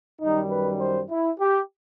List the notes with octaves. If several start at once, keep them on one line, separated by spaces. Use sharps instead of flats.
F#2 D#3 G3 D#4
B4
C5
E4
G4